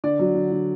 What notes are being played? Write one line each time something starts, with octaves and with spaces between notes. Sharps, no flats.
D3 D5
F#3
D3
D3